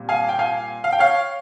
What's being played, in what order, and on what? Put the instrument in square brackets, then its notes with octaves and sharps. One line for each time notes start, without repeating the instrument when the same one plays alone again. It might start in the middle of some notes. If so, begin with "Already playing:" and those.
Already playing: [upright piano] A#2 G3 C4
F5 G#5
G5
F5 G#5
F5
G5
C#5 F5